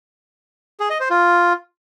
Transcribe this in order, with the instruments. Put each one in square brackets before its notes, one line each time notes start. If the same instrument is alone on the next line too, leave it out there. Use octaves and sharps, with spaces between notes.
[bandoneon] G#4
D#5
C5
F4